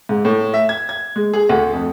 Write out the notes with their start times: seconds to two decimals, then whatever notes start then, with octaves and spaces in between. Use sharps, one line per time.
0.09 G#2
0.25 A2
0.54 E5
0.69 G#6
0.89 G#6
1.16 G#3
1.34 G#4
1.49 D2
1.73 F2